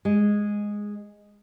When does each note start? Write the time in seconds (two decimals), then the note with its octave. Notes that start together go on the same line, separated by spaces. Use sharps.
0.05 G#3